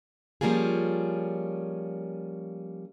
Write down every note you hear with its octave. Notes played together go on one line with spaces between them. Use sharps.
F3 G3 A#3 C#4 F4 G#4